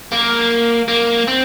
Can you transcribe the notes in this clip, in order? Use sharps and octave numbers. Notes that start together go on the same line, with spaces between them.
A#3
A#3
C4